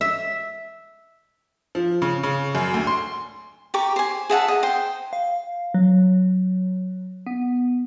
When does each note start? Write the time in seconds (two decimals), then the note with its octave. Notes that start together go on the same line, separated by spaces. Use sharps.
0.01 E5
1.75 F3
2.02 C#3
2.23 C#3
2.55 F#2
2.74 D2
2.87 C6
3.74 G4 A#5 C#6 D6
3.96 C5 G#5
4.29 G#4 E5 F#5 A5
4.48 D#5
4.63 C5 G5
5.13 F5
5.74 F#3
7.26 B3